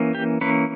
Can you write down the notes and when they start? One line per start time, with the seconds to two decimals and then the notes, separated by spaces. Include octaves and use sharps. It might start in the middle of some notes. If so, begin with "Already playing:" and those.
Already playing: E3 A#3 C#4
0.15 G4
0.41 E3 A#3 C#4 B4